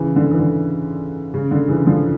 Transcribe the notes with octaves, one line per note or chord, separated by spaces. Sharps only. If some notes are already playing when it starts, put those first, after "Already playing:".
Already playing: C#3 E3
D3
E3
D3
C#3
D3
C#3 E3
D3 F3